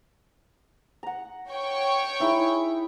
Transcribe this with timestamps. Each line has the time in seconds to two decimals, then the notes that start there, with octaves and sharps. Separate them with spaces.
1.03 F#5 A#5
1.50 C#5 G5 C#6
2.20 D#4 E4 G#4